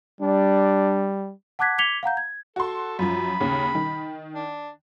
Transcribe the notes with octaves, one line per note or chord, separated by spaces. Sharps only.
G3 D4
F#5 A5 D6 F#6 G#6 B6
D6 G#6 B6 C#7 F7 G7
F5 F#5 A#5 G6
G#6
F#4 A4 C6
F#2 F3 B5
D#2 C#3
D#3
D4